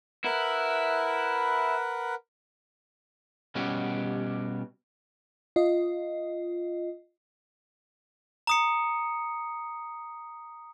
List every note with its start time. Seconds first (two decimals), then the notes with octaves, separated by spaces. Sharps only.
0.24 E4 A#4 B4 F#5
3.55 B2 G3 C#4 F#4 G4
5.56 F4 D#5
8.47 A#5 D#6 C#7